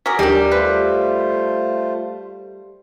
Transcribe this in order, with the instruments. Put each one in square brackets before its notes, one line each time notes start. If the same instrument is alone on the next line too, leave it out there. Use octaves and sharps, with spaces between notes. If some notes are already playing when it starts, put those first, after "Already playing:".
[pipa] F#3 G#4 A#4 [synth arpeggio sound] D6 B6
[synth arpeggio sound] D#2 G4 A#4 [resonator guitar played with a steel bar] G3 [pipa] D4 D#4
[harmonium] A3 F4 C5 [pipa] B4